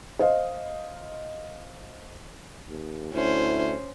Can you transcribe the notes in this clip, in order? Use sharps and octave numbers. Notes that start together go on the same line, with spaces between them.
C5 D#5 F5
D#2
D2 C#4 E4 C5